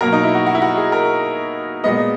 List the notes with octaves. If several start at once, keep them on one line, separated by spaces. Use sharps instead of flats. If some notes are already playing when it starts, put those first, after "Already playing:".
B2 F#3 A#3 A#4
D#4
E4
F#4
F#4
E4
F#4
G#4
A#4
A#2 G#3 B3 D#5